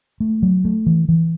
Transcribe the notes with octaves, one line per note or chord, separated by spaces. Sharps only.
A3
F#3
A3
E3
E3